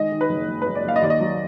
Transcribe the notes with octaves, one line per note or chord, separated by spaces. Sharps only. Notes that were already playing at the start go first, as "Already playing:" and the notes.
Already playing: D#3 G#3 D#5
D#3
B4
F#1
F#1
B4
F#1
D5
F#1 F5
D#5
D#2 D5
D#5
F#3